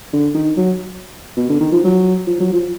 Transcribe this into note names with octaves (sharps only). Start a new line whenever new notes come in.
D3
D#3
F#3
B2
D3
D#3
F3
F#3
F3
F#3
F3